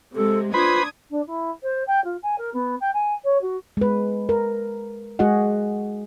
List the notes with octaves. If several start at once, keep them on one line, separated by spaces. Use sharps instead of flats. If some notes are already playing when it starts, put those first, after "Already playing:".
C3 G#3 A4
D4 F4 B4 C5 B5 D#6 G#6
D4
E4
C5
G5
F4
G#5
A#4
B3
G5
G#5
C#5
F#4
G#3 B4
A#4
G#3 F#4 G#4 D#5 F#5